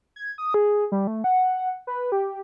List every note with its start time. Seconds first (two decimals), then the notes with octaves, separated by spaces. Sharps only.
0.16 G#6
0.38 D#6
0.54 G#4
0.92 G3
1.07 A3
1.24 F#5
1.87 B4
2.12 G4